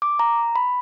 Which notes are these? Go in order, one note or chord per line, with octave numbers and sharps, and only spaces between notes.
D6
A#5
B5